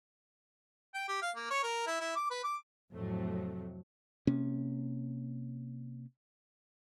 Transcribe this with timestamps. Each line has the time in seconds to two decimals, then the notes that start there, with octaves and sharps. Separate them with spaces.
0.94 G5
1.08 G4
1.22 F5
1.36 A#3
1.51 C#5
1.63 A#4
1.87 E4
2.00 E4
2.16 D6
2.31 B4
2.44 D6
2.94 F2 A2 C3 F#3 A3
4.27 C3 A#3 C#4